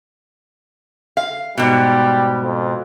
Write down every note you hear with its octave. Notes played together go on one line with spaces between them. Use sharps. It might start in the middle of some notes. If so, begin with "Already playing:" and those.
F5
G#2 B2 G3
F2